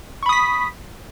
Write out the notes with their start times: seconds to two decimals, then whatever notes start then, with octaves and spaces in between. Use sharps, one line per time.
0.23 C#6
0.26 B5
0.29 D#6
0.33 B6